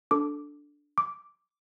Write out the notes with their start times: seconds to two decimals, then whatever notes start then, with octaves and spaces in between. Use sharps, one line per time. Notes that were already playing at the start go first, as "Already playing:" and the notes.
0.11 D4 A4 D6
0.98 D6